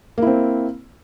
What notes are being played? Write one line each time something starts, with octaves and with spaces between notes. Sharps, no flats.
A#3 C4 E4